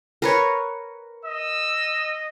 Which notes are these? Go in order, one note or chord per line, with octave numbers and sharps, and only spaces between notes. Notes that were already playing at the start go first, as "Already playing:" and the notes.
A#4 B4 C#5
D#5 E6